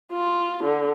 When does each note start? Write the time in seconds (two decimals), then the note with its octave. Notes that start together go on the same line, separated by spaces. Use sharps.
0.12 F4
0.64 D3